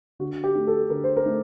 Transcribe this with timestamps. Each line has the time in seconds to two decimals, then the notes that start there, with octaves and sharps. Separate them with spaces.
0.19 D3 F#4
0.44 G4
0.55 A3 D#4
0.67 A4
0.90 D3 A#4
1.04 C5
1.17 A#4
1.26 A3 D#4